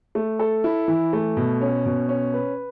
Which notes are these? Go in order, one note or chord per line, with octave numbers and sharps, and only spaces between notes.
A3
A4
E4
E3
A3
B2
C#4
B2
C#4
B4